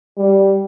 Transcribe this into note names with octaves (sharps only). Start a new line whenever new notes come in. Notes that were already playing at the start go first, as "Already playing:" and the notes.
G3